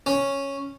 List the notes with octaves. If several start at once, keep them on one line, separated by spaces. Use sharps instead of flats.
C#4